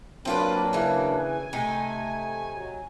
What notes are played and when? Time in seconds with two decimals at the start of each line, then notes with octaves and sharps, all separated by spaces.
0.25 F#3 A#3 C4 D4 F4 B4
0.73 C#3 E3
1.14 G#5
1.53 C3 A3 D#4
2.53 F#3